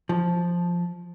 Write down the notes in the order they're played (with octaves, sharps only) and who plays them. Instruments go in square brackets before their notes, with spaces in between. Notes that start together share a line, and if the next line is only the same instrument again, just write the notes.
[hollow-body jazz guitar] F3